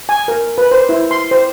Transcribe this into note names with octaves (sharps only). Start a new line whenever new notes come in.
G#5
A#4
B4
C5
E4
C6
C5